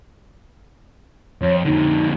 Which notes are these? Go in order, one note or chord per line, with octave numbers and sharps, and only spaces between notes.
F2 C#5
F2 D3 D#4